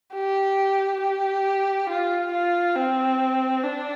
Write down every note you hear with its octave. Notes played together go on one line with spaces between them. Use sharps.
G4
G4
F4
F4
C4
D4